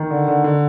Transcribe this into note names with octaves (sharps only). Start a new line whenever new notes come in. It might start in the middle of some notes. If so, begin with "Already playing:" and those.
Already playing: D#3
D3
D3
D3